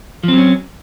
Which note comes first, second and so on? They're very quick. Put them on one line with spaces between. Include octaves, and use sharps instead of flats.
F3 C4 F#3 C#4